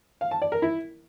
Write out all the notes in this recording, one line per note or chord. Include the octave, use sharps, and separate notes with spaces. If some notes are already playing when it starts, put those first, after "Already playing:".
F5
A5
D5
A#4
E4